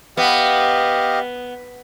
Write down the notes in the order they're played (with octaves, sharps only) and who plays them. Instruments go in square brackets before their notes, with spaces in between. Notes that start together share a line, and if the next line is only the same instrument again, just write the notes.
[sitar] B3 [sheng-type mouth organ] G4 D#5 F5